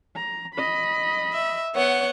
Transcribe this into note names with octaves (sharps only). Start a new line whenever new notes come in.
A#5
D#5 B5
E5
B3 C#5 F#5